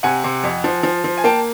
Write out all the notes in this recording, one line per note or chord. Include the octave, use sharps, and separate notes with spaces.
C3 F#5 G#5
C3
F2
F3
F3
F3
G#5
A#3 G5 A5